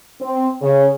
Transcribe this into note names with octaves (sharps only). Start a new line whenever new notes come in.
C4
C#3